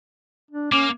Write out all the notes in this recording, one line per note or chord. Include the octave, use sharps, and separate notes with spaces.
D4
A#3 C#4 D6